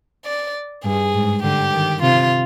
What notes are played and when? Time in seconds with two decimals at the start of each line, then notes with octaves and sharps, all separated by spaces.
0.25 D5
0.84 G2 G#4
1.14 G#2
1.43 D3 G4
1.73 D#3
2.03 C3 F4